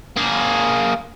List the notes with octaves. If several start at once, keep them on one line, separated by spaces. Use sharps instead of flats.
A#3 G#4